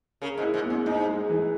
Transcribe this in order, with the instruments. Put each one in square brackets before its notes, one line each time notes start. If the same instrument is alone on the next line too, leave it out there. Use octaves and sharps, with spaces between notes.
[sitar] C#3 [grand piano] A#4
[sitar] G#2
[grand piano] E4
[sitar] G#2
[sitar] F#2 [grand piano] B3
[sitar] G#2 [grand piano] D#4
[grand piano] G#3
E3